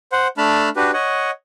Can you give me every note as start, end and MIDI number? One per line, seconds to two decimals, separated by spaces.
0.12 0.28 72
0.12 0.28 78
0.38 0.69 57
0.38 0.69 62
0.38 0.69 81
0.38 0.69 83
0.38 0.69 89
0.76 0.91 62
0.76 0.91 66
0.76 0.91 67
0.76 0.91 71
0.94 1.31 73
0.94 1.31 75
0.94 1.31 78